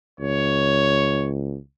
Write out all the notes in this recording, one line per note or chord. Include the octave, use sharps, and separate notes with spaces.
C#2 C#5